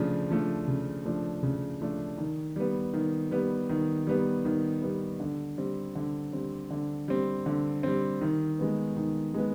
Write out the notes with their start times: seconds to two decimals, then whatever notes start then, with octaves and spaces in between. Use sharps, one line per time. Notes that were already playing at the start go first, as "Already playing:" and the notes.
Already playing: C#3 F3 A3 D4
0.30 F3 A3 D4
0.68 C#3
1.05 F3 A3 D4
1.43 C#3
1.81 F3 A3 D4
2.18 D#3
2.56 G3 B3
2.94 D#3
3.31 G3 B3
3.69 D#3
4.07 G3 B3
4.45 D#3
4.82 G3 B3
5.20 D3
5.58 G3 C4
5.95 D3
6.33 G3 C4
6.70 D3
7.08 G3 C4
7.46 D3
7.83 G3 C4
8.21 D#3
8.59 G#3 B3
8.97 D#3
9.34 G#3 B3